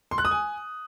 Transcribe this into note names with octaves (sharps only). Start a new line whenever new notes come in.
C6
F#6
D#6
G#5